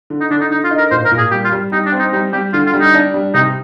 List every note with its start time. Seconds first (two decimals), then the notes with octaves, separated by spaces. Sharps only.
0.10 D3
0.21 D#4
0.31 D3 D4
0.41 D#4
0.51 D3 D#4
0.64 F4
0.71 D#4
0.78 A#4
0.91 A#2 C5
1.05 A#4
1.11 A#2
1.18 G#4
1.31 G3 G4
1.45 F4
1.52 G3
1.72 G3 D#4
1.86 D4
1.92 C4
1.99 D#4
2.13 G3 D#4
2.33 G3 G4
2.53 D3 F4
2.67 F4
2.74 G3
2.80 D#4
2.94 D4
3.14 G3
3.34 C3 D#4